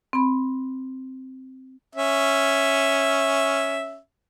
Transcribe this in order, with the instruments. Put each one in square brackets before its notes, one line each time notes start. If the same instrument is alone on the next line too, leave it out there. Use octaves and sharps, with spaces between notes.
[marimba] C4 B5
[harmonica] C#4 E5